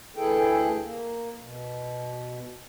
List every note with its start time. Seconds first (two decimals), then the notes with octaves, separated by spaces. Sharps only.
0.17 D2 E3 E4 G#4 A4 G5
0.82 A#3
1.40 B2